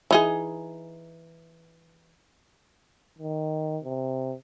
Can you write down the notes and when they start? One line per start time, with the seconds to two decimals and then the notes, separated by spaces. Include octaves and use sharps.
0.11 E3 D#4 G#4
3.18 D#3
3.84 C3